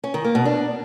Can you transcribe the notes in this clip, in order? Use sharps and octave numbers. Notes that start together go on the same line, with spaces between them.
C#4
D#3
A#3
B2
D4